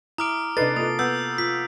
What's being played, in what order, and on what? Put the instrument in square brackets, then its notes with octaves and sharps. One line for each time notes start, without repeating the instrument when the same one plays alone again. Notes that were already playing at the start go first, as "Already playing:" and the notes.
[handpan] E4 [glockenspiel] A#5 D6 [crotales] D#6 F6 D7
[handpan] C3 A4 [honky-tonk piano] D4 D#4 B4 [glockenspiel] A6 C7
[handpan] A#3 F4 A4 [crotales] D#6
[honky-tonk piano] B3 [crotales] E6 G6
[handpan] F4 [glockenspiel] B6